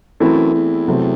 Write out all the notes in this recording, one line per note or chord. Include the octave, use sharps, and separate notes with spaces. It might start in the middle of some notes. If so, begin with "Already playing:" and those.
F#2 E3 A3 C4 E4
E2
C3 F#3 A3 C4